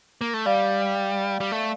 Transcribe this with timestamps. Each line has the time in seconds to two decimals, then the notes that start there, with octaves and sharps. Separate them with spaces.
0.21 A#3
0.34 A3
0.46 G3 D5 F5
1.40 G3
1.52 A3